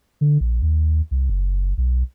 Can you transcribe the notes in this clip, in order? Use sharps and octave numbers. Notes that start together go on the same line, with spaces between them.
D3
A#1
D#2
C2
F#1
B1